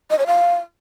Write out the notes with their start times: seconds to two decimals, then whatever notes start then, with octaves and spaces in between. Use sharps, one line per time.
0.10 D#5
0.18 C#5
0.27 F5